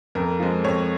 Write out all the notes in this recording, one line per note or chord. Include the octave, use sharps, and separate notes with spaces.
F2 A#4
F3 G#3
F2 C#5